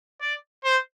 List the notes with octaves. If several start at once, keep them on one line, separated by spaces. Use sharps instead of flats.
D5
C5